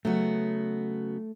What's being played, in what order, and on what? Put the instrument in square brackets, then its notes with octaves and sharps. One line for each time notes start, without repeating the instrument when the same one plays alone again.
[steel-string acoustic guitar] C#3 F#3 B3 F#4 [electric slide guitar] A3